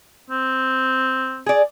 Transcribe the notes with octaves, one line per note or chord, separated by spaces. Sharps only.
C4
G#4 D5